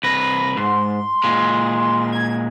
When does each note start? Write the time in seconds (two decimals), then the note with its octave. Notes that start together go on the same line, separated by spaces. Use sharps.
0.03 C2 B4 A#6
0.57 G#2 C6
1.23 A#2 G#3
2.12 G#6